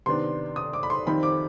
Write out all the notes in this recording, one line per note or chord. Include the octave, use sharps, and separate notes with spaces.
C3 D#3 B3 D4 C6
D#6
D6
B5
C6
F2 D#3 G3 C4 D#4 B5
D6